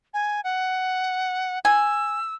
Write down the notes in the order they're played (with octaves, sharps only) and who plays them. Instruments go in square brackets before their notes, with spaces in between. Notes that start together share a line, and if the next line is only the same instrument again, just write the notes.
[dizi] G#5
F#5
[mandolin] G#5 [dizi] E6